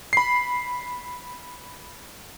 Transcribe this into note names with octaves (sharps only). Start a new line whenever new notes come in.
B5 C7